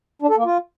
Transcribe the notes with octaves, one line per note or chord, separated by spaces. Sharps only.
D4
A4
A#3
F4